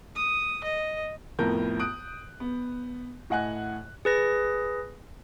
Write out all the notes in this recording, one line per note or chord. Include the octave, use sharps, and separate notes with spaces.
D#6
D#5
F2 A2 B3 A#4 G6
D#6 F#6 D7
B3
A2 D#5 F#5 G#5 F#6
G#4 B4 A#6